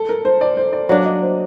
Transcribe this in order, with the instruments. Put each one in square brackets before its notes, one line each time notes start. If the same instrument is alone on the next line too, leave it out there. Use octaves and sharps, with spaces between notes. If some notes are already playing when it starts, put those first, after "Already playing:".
Already playing: [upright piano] A4
A#4
C5
D5
C5
D5
[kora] F#3 A#3 D4 [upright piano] D5
[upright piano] D#5
C5